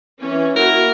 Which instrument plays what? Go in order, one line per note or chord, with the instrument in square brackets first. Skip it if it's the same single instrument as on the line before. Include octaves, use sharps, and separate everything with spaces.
[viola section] E3 C#4
[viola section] A#3 E4 F#4 [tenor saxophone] A#4